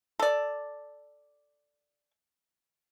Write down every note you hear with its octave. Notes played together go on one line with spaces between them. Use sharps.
A4 D5